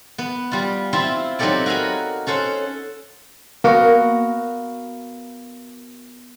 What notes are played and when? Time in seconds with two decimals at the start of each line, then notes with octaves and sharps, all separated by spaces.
0.18 B3
0.52 G3 F4
0.93 C4 E4 F4 E5
1.39 F#3 C4 D#4 G4 A4 D5
1.66 F#4 A#4 F5 G#5 B5
2.27 C#4 A4 C5 F#5
3.64 A#3 B3 F#4 A#4 F5